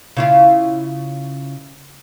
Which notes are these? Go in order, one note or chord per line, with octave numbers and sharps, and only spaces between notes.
C#3 E4 F4